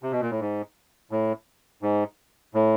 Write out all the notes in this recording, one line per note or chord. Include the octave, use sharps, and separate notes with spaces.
C3
B2
A#2
A2
G#2
A2
G#2
A2